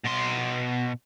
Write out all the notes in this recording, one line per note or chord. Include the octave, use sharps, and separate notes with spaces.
B2 C6